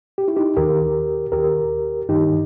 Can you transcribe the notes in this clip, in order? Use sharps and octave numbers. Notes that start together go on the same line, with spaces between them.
G4
E4
D#4 G4
D#2 D#3 G4 A#4
D#2 D#3 G4 A#4
G2 D#3 D#4 G4